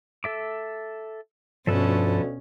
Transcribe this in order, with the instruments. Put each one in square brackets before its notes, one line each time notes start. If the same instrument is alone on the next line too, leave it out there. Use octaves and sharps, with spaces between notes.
[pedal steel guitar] A4 E5 D6
[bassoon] D2 [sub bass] G2 [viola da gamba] B2 C#4 [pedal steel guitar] F3 A4 B4